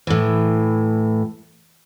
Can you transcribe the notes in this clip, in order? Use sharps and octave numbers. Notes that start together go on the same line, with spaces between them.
A2 E3